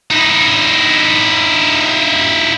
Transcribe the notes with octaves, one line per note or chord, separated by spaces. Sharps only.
D#4 E4